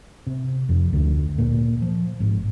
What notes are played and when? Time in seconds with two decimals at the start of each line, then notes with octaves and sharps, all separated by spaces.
0.27 C3
0.69 F2
0.93 D2
1.38 A#2
1.82 F3
2.20 G#1